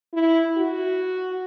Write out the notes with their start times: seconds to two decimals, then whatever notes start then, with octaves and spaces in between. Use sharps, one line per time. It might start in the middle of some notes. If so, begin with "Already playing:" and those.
0.13 E4
0.58 F#4